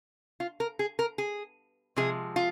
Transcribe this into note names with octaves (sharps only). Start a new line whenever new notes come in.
F4
A#4
G#4
A#4
G#4
C3 F3 G#3 G#4
F4